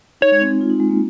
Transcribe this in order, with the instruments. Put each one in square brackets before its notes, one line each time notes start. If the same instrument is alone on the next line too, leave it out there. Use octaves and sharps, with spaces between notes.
[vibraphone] D#4 [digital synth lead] C#5
[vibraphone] G#3
C4
D#4
F4
D#4
G#3
A#3